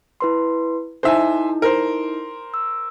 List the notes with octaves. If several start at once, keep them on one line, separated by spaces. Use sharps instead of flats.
E4 B4 C6
D#4 E4 A4 C5 E5 G#5
A#4 C5
E6